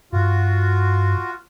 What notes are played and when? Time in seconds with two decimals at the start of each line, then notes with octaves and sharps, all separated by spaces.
0.13 G2 F4 F#4